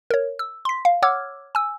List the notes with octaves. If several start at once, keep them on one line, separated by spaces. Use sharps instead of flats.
A#4 C#5
E6
C6 B6
F5
C#5 F#5 D6 E6 F6 G#6
G#5 E6